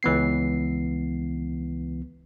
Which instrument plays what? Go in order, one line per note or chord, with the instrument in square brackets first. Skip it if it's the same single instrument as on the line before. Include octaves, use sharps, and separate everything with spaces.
[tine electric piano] C#2 E3 B3 C7